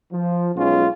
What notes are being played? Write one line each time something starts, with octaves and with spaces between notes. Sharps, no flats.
F3
B1 G#3 C#4 F4